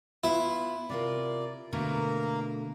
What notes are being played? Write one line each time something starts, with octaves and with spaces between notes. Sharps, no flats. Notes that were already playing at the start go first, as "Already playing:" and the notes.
B3 E4 F4
C3 F4 A#4 D5
B2 D3 A3 A#3 A#4